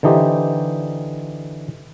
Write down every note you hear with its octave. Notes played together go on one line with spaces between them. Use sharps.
D3 E3 D#4 G4 C5